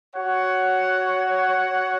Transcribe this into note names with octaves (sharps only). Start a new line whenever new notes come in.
F#4 C#5 F#5